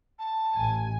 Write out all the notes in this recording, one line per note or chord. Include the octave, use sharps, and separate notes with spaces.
A5
A1 G#5